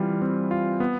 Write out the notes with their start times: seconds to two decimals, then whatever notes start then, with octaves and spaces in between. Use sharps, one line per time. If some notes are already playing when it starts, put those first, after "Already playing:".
Already playing: E3 G3 C4 F4
0.22 C4
0.51 F4
0.80 B3